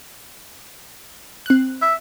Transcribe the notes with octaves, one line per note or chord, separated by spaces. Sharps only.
C4 F#6
E5